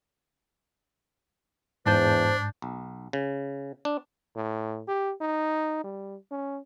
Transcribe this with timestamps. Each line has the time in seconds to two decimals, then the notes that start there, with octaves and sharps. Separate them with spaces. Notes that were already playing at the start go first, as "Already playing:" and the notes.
1.86 E2 G#2 D4 C5 A5 G6
2.62 B1
3.13 C#3
3.85 D4
4.36 A2
4.88 G4
5.21 D#4
5.84 G3
6.31 C#4